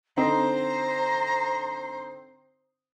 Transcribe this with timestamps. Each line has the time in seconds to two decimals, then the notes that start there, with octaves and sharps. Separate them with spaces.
0.17 D3 C4 D#4 C5 A#5